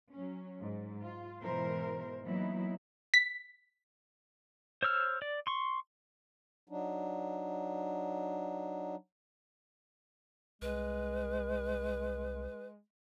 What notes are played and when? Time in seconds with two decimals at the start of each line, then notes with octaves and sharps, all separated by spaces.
0.13 F#3 C#4
0.62 G#2
1.01 F4
1.42 G#2 B2 E3 A#4 C5
2.23 E3 F#3 A#3 B3 D#4 E4
3.14 B6
4.83 C5 C#5 E6 F6
5.22 D5
5.47 C6 C#6
6.69 F#3 D4 D#4
10.62 C2 G#3 B4